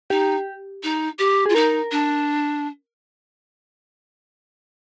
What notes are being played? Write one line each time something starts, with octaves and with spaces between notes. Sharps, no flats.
D#4 G4
D#4
G4
F4 G#4
D#4 A#4
D4